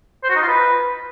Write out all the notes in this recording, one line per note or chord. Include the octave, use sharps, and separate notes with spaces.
C5
F#4
D#4
F4
B4